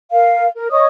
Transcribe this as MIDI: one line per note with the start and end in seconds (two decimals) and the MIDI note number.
0.11 0.47 70
0.11 0.47 77
0.55 0.68 70
0.71 0.87 73
0.71 0.87 75
0.71 0.87 85
0.71 0.87 87